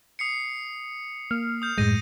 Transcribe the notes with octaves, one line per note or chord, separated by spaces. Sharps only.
D#6 C7 C#7
A#3 F6
D#6 G6
F#2 A2 G#3 G6 A#6 D#7